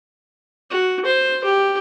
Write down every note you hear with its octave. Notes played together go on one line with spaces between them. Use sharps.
F#4
C5
G4